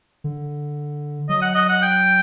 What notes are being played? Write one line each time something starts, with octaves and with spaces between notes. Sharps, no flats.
D3
F#3 D#5
F#5
D#5
F#5
G5